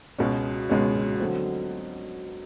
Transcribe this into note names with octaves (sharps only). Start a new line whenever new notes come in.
C#2 B2 G#3 C#4
C#2 B2 G#3 C#4
D3 F#3 A3 C4